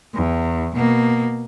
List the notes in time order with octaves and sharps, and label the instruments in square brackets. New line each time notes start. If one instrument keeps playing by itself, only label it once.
[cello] E2
B2 A#3